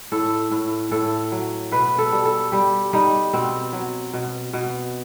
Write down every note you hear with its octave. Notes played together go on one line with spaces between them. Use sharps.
A2 A4
A2
A2 A4
F#3
B2 B4
A4
G3
A4
G3 G4
G3 D#4
B2 C4
F#3
B2
B2